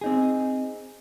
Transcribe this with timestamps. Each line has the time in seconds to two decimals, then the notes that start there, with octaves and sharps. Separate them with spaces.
0.01 C4 D#4 G#4